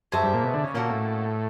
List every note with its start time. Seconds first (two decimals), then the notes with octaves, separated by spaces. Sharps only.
0.12 F#2 G#4 C5 E5 A5
0.23 G2
0.33 A#2
0.44 B2
0.54 D3
0.64 C#3
0.74 A#2 A#3 C#4 F#4 A4
0.90 A2